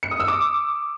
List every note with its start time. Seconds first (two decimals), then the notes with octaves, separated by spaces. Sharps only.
0.03 C#7
0.11 D#6
0.20 E6
0.28 D6